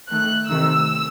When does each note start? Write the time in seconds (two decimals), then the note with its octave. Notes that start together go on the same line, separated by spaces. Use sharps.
0.10 D#3 A3 F#6
0.50 C3 D#3 A3 E6